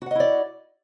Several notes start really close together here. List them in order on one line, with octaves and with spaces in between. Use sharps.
F#4 F#5 D#5 E4 D5